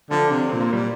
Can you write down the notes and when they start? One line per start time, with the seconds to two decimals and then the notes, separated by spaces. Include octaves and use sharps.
0.11 D3 F3
0.32 C3 D4
0.48 A#2 C4
0.60 A#3
0.73 A#2 G3